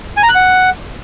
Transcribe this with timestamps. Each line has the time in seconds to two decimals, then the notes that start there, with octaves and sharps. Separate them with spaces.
0.17 G#5
0.23 A#5
0.29 F#6
0.35 F#5